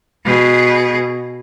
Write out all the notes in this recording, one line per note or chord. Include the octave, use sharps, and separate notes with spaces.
B2 G#4